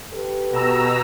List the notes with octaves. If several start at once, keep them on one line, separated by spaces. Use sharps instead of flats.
G4 A4 B4
B2 A#5 E6